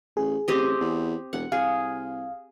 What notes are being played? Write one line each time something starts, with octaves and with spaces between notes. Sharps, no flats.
A1 G#4
A1 C4 G4 D#5
E2
E1 F#5
C2 G#4 F5